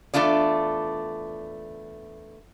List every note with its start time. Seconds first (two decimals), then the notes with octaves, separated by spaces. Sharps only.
0.14 E2 A3 D4 F4 D5